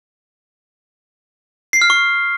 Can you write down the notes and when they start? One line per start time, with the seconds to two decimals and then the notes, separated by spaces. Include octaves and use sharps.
1.73 C7
1.82 F6
1.90 C#6